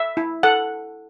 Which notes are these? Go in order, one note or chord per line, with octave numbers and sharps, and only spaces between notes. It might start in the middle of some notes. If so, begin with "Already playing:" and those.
Already playing: E5
E4
A4 F#5